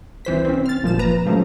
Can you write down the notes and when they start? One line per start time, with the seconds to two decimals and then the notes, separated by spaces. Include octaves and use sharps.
0.25 C2 E3 C5 B6
0.45 C4 C#4
0.66 F6 A6
0.83 G1 A#2 F3 E7
0.99 B4 A#5
1.26 C#3 F3 F#3 A3 C#4